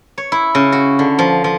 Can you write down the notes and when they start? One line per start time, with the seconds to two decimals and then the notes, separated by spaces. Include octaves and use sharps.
0.18 C#5
0.32 E4
0.55 C#3
0.72 F#4
0.99 D3
1.19 F3
1.44 F3